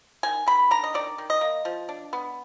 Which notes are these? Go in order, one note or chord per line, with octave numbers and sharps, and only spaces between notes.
D#3 G#5
D#3 B5
D4 A#5
D#5
D#3 D5
D#3
D#5
A#3
F3
D4
B3